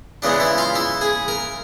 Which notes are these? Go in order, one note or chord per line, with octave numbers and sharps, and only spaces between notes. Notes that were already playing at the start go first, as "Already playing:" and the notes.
C#3 E3 G#3 B3 D4 D5
E4 E5
F4 F5
E4 E5
G#4 G#5
A#4 A#5